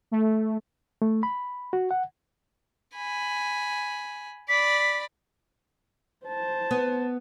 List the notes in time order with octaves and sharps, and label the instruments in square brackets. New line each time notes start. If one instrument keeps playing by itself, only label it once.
[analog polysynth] A3
[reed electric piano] A3
B5
F#4
F#5
[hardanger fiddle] G#5 B5
[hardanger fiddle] D5 B5 [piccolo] B6
[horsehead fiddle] C5 A5
[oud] B3